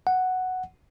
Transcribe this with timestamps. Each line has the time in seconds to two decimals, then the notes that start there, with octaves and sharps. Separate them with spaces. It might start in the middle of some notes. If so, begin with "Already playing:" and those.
0.07 F#5